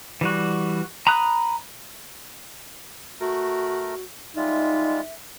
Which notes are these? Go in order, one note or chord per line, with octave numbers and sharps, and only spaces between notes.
E3 G3 F#4
A#5 B5 D#6 F#6
A3 F#4 A#4
G3 G#3 D#4 F4 E5